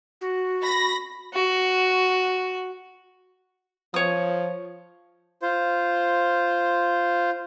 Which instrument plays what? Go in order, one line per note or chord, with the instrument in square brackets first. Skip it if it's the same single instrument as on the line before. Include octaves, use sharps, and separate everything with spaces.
[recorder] F#4
[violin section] B5 A#6
[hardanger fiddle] F#4
[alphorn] F3 [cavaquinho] C#5 D#6
[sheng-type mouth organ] F4 C5